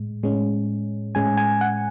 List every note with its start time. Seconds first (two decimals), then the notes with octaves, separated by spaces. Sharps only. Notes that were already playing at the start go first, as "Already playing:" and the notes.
Already playing: A2 G#3
0.23 A2 G#3 C#4
1.15 A2 G#3 C#4 G#5
1.37 G#5
1.61 F#5